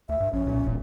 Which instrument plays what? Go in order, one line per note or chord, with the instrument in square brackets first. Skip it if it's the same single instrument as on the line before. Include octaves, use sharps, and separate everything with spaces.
[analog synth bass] D2 [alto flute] E5
[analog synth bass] G2
[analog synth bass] A#1 [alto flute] C#4
[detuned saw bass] B1 [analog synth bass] A#2
[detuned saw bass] E1 [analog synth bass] A#2